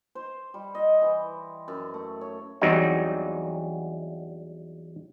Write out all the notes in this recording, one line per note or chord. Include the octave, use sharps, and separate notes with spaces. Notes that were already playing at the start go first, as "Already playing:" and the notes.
C5
G3
D#5
E3
F#2
A3
C#5
E2 F#3 G3 C4 D#4